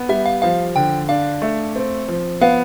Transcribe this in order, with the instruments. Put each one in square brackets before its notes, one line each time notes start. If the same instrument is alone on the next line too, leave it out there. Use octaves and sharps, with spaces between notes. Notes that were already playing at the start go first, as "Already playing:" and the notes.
Already playing: [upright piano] B3
[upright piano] G3 [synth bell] E5
[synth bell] F5
[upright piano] F3 [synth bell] F5
[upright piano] D3 [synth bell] G5
[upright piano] D4 [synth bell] F5
[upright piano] A3
C4
F3
[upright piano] B3 [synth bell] F5